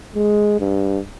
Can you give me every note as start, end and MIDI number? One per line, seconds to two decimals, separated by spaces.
0.15 0.59 56
0.60 1.00 43